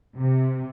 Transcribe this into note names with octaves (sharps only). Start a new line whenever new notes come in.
C3